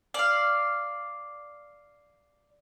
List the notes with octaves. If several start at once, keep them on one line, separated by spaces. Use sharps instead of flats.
D5 F5